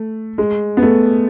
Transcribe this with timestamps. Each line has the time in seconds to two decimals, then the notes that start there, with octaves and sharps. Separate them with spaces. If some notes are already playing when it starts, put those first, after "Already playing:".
Already playing: A3
0.38 G#3
0.77 B3
0.82 A3